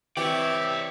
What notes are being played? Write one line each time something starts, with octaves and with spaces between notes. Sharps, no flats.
E3 C4 G4 C#5 D5 E5